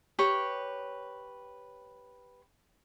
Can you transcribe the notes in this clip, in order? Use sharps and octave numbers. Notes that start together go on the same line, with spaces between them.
G4 B4 C#5